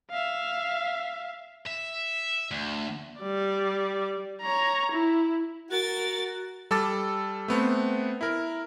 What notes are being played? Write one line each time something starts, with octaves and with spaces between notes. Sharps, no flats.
E5 F5
E5
D2
G3 D5
C#5 A#5
E4
F#4 A#4 A6
G3 A4 D6 A6
A3 B3 C4
E4 A#4